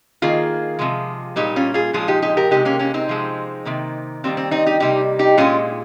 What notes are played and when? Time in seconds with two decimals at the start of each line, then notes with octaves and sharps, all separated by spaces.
0.22 D#3 A#3 F4 G#4
0.79 C3 F3 G#3
1.36 A#2 G3 A#3 D#4 G4
1.56 C#4 F4
1.74 F4 G#4
1.93 A#2 F3 G#3 F4 G#4
2.08 D#4 G4
2.22 D#4 G4
2.37 G4 A#4
2.51 C3 D#3 G#3 D#4 G4
2.65 A#3 C#4
2.79 A#3 C#4
2.94 C4 D#4
3.08 C3 F3 G#3
3.65 C3 D#3 A#3
4.24 D#3 G3 A#3 C4
4.37 C4
4.51 C4 D#4
4.66 D#4 G4
4.80 C3 G3 A#3 D#4 G4
5.19 D#4 G4
5.37 A#2 G#3 C#4 F4